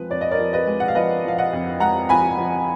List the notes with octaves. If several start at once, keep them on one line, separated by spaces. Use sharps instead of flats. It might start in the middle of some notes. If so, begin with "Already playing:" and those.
Already playing: F2 F3 G#3 B4
F2 D5
D#5
A#4 D5
F3
B4 D#5
G#3
F#5
F5
F3 B4 D#5
F3 F5
D#5 F#5
F2
G#3 F#5 A#5
F3 G#5 B5
F3